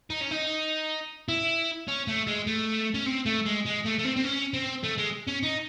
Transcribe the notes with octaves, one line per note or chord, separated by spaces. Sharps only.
D#4
C#4
D#4
E4
C#4
A3
G#3
A3
C#4
C4
A3
G#3
G#3
A3
A3
C4
C4
C#4
C4
A3
G#3
C#4
D#4